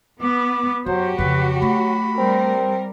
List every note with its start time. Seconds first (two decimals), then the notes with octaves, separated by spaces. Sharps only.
0.22 B3 D6
0.86 F#2 F#3 F#4 G4 C5
1.18 F2 C#3 F#3 B4
1.62 A3 B5
2.18 G3 C4 A#4